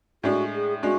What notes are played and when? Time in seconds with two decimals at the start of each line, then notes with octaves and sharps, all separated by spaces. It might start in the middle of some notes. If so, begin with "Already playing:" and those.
0.24 A2 G#3 D4 F#4
0.53 G#4
0.83 G#3 D4 F#4